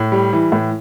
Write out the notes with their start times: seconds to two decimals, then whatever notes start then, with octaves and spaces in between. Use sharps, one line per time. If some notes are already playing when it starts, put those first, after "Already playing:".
Already playing: A2
0.12 G3
0.33 E3
0.52 A2